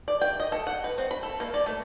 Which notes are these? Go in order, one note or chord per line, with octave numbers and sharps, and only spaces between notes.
D5
G5
D#5
A4
F#5
B4
C4
B5
A4
A#3
D5
A3